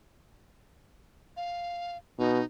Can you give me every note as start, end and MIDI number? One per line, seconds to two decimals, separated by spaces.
1.37 1.97 77
2.19 2.40 47
2.19 2.45 63